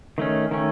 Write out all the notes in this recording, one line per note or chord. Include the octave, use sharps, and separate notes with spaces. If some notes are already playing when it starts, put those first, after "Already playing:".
D#3 A3 C#4
D#3 A3 C#4